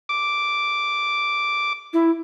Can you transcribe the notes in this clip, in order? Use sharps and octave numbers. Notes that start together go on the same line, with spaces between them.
D6
E4